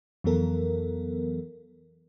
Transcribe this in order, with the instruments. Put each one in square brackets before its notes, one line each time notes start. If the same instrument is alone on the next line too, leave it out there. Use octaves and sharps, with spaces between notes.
[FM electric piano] F2 E3 F#3 B3 A4 A#4